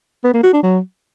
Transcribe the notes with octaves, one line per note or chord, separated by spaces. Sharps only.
B3
A#3
F#4
D4
F#3